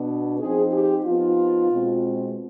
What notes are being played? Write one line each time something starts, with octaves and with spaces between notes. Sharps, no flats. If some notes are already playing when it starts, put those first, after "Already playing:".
Already playing: B2 B3 D4
F3 C4 D#4 G#4
G4
F3 B3 D#4 F4
B2 G#3 C4